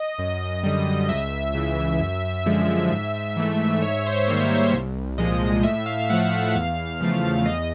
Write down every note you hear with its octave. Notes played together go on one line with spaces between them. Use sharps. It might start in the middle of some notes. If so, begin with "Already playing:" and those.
Already playing: D#5
F#2
D3 G3
C#2 E5
C#3 E3
F#2
D3 F3 G#3
G#2
E3 A3
G#2 C#5
C5
C#5
D#3 G3 A#3
C5
C2
A#2 F3 G#3 D#5
A2 E5
F5
F3 A3 F#5
F5
E2
C#3 F3 A3
E2 D#5